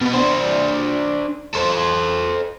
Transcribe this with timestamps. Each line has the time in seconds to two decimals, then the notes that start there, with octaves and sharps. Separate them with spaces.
0.01 B2 B3
0.13 D4 C5
1.54 A4 C5